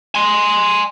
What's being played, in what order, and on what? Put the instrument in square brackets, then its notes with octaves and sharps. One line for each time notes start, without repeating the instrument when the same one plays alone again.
[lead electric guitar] G#5 C6